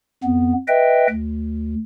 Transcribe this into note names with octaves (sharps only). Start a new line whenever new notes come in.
F2 B3
B4 D#5 E5 G5
D2